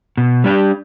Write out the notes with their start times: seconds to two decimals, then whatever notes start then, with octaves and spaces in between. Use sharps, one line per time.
0.17 B2
0.44 G3 D4 G4